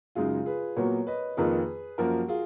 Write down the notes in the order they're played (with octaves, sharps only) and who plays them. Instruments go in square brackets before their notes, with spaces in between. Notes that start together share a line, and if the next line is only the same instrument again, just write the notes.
[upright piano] F#2 C#3 G#3 D#4 [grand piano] F4 G#4
[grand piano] G#4 B4
[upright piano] A#2 F#3 B3 F#4 [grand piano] A#4 C#5
[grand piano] B4 D#5
[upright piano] F2 D#3 A#3 F4 [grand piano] G#4 B4
[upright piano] F#2 F3 A#3 [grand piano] F#4 A#4
[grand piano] F4 G#4